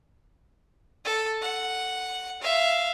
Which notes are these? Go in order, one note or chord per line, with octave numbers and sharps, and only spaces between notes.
A4
F#5
E5 F5